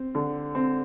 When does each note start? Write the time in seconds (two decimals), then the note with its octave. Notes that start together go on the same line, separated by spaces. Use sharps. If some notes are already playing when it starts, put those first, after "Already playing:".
Already playing: C4
0.15 D3
0.55 C4